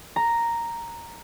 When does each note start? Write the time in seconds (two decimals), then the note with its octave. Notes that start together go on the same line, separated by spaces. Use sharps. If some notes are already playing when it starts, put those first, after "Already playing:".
0.16 A#5